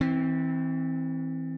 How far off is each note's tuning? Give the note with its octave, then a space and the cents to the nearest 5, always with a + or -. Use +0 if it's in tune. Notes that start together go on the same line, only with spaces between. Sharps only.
E3 -30 C4 +0